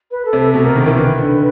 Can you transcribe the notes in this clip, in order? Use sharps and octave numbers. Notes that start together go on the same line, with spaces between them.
B4
A4
C3
A4
B2 A4
B2 A#4
D#3
E3 A#4
D#3 B4
D3